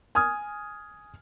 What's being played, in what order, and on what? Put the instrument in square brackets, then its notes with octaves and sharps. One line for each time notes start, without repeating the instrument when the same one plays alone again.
[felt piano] G#5 D#6 F6 G#6